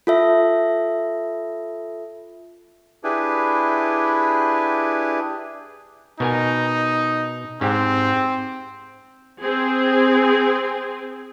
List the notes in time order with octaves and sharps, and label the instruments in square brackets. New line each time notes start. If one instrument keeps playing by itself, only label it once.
[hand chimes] F4 A4 E5
[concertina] D4 E4 G4 G#4 B4
[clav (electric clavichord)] B2 A#4 G#5 [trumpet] D#4
[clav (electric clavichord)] G#2 G4 [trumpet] C4
[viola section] C4 G#4